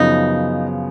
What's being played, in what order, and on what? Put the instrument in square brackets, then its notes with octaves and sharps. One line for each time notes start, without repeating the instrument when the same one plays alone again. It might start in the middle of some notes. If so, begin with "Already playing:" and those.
Already playing: [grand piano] F#2 C#3 F3 B3 [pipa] D#4